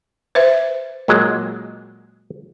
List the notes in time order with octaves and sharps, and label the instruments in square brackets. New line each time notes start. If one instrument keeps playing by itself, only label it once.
[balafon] B4 C5 E5
[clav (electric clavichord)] A#2 F#3 G#3